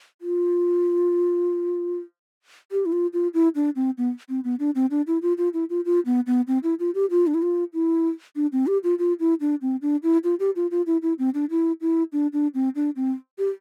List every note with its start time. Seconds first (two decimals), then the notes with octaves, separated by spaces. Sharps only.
0.22 F4
2.72 G4
2.86 E4
2.92 F4
3.13 F4
3.34 E4
3.55 D4
3.76 C4
3.98 B3
4.29 C4
4.44 B3
4.59 D4
4.75 C4
4.91 D4
5.07 E4
5.22 F4
5.38 F4
5.54 E4
5.70 F4
5.85 F4
6.06 B3
6.27 B3
6.47 C4
6.63 E4
6.80 F4
6.95 G4
7.10 F4
7.27 D4
7.34 E4
7.42 F4
7.74 E4
8.36 D4
8.52 C4
8.67 G4
8.84 F4
8.99 F4
9.20 E4
9.41 D4
9.62 C4
9.82 D4
10.03 E4
10.24 F4
10.40 G4
10.56 F4
10.71 F4
10.86 E4
11.02 E4
11.19 C4
11.34 D4
11.50 E4
11.81 E4
12.13 D4
12.33 D4
12.54 C4
12.76 D4
12.96 C4
13.38 G4